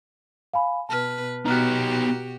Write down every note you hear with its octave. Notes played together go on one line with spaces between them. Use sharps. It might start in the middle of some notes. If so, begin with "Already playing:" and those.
F5 G#5 B5
B2 B4 A5 F6
B2 B3 D#4 F#4 G4 A#5 F6 F#6